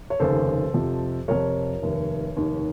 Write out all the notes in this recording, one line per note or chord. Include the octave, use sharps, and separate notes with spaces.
C#5
F1 D#2 C#3 A4 C5
F2 C3 F3
F2 C3 F3 A#4 C#5
F1 D#2 D#3
F1 D#2 D#3